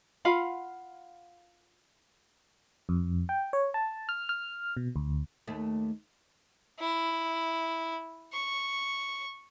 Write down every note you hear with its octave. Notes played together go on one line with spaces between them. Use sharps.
F4 F5 F#5 B5
F2
G5
C#5
A5
F6
F6
B2
D2
D#2 A3
E4
C#6